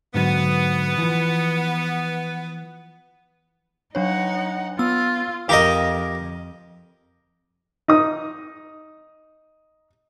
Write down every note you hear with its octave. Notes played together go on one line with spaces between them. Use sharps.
G#2 D3 F#3 B3
E3 F3
F#3 D4 D#4 C#5 F#5
B3 F4 E6
F2 G4 A#4 D#5 F5 G5
D#4 D#6